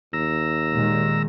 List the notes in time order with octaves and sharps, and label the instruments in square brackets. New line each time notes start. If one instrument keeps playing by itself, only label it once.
[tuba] D#2 [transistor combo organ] A#5 E6
[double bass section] A#2 D#3 G#3